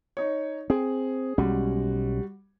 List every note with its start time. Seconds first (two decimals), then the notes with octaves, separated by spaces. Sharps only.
0.17 D#4 C#5
0.70 C4 G#4
1.38 B1 G3 G#3 C#4 F#4